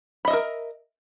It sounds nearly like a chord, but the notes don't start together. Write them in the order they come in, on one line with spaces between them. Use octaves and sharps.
B5 D#5 E5 A#4